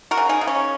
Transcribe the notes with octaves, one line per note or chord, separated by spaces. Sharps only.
F#4 A#4
C#3
D#4 G#4
C#3
C#4